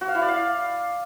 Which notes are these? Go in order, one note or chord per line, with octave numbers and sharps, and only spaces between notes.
F#4
F5
E4
D5
F5